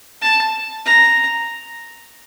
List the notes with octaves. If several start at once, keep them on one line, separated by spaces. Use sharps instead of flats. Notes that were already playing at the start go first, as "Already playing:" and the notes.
A5
A#5